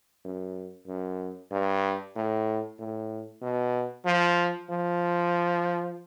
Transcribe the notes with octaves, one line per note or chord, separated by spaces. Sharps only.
F#2
F#2
G2
A2
A2
B2
F3
F3